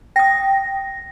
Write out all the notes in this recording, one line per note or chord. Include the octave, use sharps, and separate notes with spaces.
G5 D#6 A#6